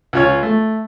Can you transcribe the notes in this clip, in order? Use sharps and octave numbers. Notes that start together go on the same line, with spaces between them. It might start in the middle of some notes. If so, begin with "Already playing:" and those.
C#2 F4 C#5
A3